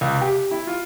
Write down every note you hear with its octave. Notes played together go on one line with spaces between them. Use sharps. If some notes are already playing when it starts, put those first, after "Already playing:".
C#2
G4
E4
F4